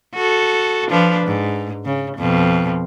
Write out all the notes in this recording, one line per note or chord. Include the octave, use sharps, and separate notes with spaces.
F#4 A4
F3 D4 B4
G#2
C#3
F2 B2